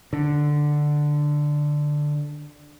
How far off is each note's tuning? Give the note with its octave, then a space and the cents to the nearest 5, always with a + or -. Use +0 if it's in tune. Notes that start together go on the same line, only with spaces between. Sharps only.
D3 +5